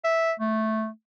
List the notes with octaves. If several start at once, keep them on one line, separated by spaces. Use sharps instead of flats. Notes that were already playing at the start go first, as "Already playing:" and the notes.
E5
A3